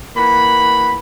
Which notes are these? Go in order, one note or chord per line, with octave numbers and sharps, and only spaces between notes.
E3 A#3 F#5 B5